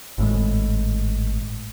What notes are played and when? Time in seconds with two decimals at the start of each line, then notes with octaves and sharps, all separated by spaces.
0.18 G#1 A2 G#3